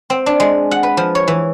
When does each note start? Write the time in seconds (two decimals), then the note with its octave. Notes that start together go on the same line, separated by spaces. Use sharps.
0.10 C4
0.26 D4
0.40 G#3
0.71 F#5
0.83 B4
0.97 F3
1.15 C#5
1.28 E3